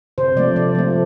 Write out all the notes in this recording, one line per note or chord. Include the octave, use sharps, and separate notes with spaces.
C3 C5
F3 A3 D5
C3 D5
F3 A3